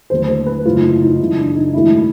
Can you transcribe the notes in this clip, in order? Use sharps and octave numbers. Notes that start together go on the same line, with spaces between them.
D#2 D3 F#3 A3 C5
C5
B4
F#2 C#3 F#3 A3 F4
D#4
E4
D#4
F#2 C#3 E3 G#3 B3 E4
D4
D#4
G#2 D#3 F#3 A3 E4